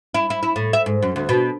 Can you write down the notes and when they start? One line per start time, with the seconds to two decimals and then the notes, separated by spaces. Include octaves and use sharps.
0.14 E4
0.30 E4
0.43 E4
0.56 A2
0.73 E5
0.86 G#2
1.02 F#2
1.16 D2
1.29 B2